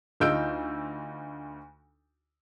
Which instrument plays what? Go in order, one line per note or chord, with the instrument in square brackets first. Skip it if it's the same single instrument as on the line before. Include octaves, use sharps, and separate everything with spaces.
[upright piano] D2 D#4 F4 E6 G6 D7